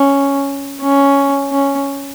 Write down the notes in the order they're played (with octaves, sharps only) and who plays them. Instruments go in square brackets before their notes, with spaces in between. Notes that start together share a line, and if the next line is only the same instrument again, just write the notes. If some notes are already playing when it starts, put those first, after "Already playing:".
Already playing: [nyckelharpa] C#4
C#4
C#4